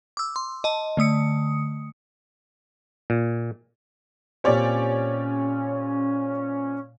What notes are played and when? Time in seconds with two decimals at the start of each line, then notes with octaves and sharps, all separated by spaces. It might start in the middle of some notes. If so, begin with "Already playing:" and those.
0.17 D6 E6
0.36 C6
0.64 D#5 A5
0.97 D3 A3 D#6 C#7
3.10 A#2
4.44 A#2 C4 C#4 G4 C#5 D5